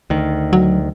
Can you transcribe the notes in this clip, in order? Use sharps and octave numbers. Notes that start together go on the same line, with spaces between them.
D2 D#3
F#3